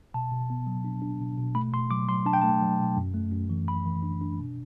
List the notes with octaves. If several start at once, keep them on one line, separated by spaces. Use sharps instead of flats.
B2 A5
B2
B3
F#3
D4
D4
B2
B2
A3 B5
B2 C6
F#3 D6
F#3 C6
D4 A5
G5
A3 A5
F#3
B2
F#2
A3
F#2
E3
E3 B5
E3
D4
D4
B2